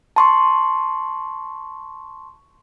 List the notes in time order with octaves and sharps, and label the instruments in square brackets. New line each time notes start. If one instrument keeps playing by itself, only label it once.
[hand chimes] A5 C6 C#6